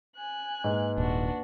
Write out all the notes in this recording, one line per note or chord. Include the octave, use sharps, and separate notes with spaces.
G#5 F#6
G#2 A#3 B4
D#1 D4 F#4